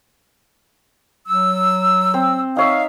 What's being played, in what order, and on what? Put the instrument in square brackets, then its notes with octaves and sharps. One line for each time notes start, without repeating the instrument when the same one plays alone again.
[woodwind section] F#3 E6
[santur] C4
[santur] D#4 C#5 E5 [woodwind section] F5